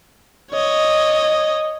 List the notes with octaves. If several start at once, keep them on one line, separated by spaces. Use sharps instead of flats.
C#5 D#5